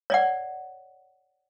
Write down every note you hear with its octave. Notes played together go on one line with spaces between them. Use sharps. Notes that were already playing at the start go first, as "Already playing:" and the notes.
C#5 D5 F#5